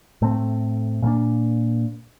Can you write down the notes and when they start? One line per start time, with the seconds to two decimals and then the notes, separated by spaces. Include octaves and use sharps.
0.22 A2 A3 C4
1.02 A#2 G3 A#3 D4